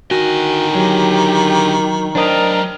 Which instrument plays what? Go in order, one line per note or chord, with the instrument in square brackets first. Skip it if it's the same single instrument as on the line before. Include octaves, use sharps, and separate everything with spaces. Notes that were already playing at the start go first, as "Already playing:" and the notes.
[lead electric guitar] D3 G#5 [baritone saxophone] D#3 [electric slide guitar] F#4
[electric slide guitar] F#3 [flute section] G4
[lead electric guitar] F#3 D5 [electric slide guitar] D4 C5 D#5 [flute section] A#4 G5 A#5